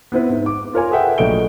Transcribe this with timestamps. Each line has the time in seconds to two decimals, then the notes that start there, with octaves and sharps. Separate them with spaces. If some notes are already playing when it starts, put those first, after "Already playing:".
0.12 B3 C4 E4 B4
0.29 G#2
0.46 D6
0.73 F4 A#4 C#5 G#5
0.91 G#4 A4 B4 E5 F#5 G5
1.18 A#1 F#3 A3 D#5 D7 G7